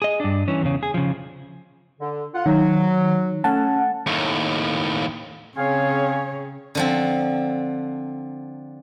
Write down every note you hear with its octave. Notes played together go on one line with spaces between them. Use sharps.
G#4 D#5
G2 D4
E3 C#4
E2 C#3
G#4
C#3 F3
D3
F4 F#5
D#3 F#3
A3 C#4 F#5 A5
D#2 A2
C#3 C4 G#4 C#5 F5 G#5
D3 F3 C4